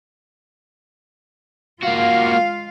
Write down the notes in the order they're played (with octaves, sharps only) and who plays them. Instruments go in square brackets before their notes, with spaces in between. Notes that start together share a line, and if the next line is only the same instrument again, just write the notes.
[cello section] G#3 F4 F5 [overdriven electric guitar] A#3 F#4